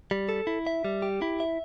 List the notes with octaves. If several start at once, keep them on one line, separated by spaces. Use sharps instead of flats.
G3
A4
E4
E5
G3
G4
E4
E5